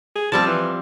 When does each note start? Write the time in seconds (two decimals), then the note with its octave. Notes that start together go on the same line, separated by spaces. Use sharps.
0.15 G#4
0.32 F3 G3 C4 A5
0.47 E3